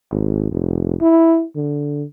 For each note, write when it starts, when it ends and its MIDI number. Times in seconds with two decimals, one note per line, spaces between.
0.11 0.51 32
0.51 0.95 29
1.01 1.45 64
1.56 2.04 50